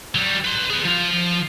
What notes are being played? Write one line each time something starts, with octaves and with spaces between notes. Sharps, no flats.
F#3 G3
B4 C6
G#4 B4
F3 F4